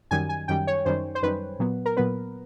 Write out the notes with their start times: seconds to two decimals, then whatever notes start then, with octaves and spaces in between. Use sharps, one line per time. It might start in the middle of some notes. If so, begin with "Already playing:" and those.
0.11 F#2 D#3 G3 G#5
0.29 G#5
0.48 F#2 D#3 G3 G5
0.67 C#5
0.85 F#2 D#3 G3 C5
1.15 C5
1.22 F#2 D#3 G3 B4
1.59 A#2 F#3 B3
1.86 A#4
1.97 A#2 F#3 B3 B4